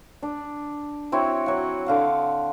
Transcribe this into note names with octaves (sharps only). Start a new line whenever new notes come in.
D4
C4 E4 F#4 C#5
F#3 F#5
D3 F5 F#5